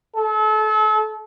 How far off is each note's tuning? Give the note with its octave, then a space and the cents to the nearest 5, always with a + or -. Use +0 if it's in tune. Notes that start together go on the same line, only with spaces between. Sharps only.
A4 -35